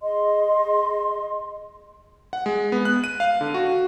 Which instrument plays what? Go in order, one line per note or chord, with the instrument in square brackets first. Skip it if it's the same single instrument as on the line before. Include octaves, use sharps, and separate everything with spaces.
[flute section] G#4 D#5 C6
[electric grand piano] F#5
G#3
B3
F#6
D#7
F5
D3
F#4